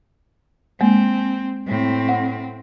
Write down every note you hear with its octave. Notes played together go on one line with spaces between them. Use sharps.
G#3 A#3 C4
A2 C4
F#5